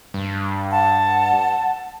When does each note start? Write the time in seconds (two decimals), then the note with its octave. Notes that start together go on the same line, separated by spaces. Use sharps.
0.14 G2
0.71 F#5 A5